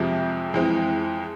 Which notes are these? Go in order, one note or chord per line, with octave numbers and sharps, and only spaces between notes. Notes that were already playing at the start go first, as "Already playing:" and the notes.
Already playing: F2 C3 F3 G#3
F2 E3 G#3 C4